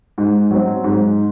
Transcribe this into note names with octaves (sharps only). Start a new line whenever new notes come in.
G#2
F#3 C4
G#2